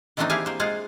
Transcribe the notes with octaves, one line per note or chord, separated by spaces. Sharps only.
D#3 E3 A3 C4 D4 D#4
A#3 E4 G4 G#4 F5 G#5
A#3 C5
G#3 F4 G#4 F5 F#5